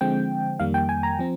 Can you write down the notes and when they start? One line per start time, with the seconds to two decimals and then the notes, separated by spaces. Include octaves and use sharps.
0.01 D3 F3 G#3 C4 G5
0.59 F2 D#3 G3 A#3 F5
0.74 G5
0.89 G#5
1.03 A#5
1.19 F3 C4